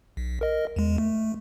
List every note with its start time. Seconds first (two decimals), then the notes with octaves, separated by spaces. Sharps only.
0.17 B1
0.41 A#4 D#5
0.76 E2 G#3
0.98 A3